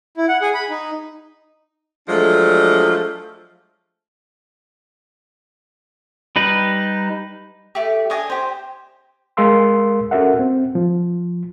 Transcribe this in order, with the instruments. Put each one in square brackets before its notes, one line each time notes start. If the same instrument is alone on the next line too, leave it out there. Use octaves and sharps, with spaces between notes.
[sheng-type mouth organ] E4
F#5
G#4
B5
D#4
[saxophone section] F3 F#3 G#3 A3 D4
[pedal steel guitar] G3 D#4 B4
[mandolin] A3 G4
D4 C#5 D#5 G#5
G4 C5
[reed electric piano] G#3 A#4 F5 C6 E6
C#4 F#4 A4 A#4 E5 F#5
C4
F3